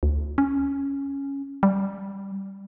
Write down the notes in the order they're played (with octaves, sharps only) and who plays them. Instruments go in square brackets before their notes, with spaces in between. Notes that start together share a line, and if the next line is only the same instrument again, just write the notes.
[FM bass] D2
C#4
G3